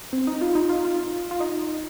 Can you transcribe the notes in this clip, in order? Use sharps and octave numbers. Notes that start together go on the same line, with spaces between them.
C4
D#4
F4
D#4
F4
F4
F4
D#4